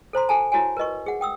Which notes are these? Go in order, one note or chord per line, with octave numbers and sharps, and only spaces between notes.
A4 C5 A#5 C6
F#4 A4 G#5 A5
E4 F#4 C#5 G#5
A#4 B4 D#5 C#6
G#4 F#5
G5 D#6 E6